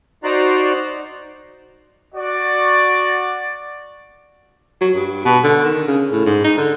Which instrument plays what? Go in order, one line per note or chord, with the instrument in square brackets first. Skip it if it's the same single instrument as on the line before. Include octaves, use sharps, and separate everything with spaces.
[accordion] D#4 F#4 C5 D5 A#5 F#6
[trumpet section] F#4 D5
[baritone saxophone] F#3
G2
B2
D3
D#3
C#3
A2
G#2
D#4
D3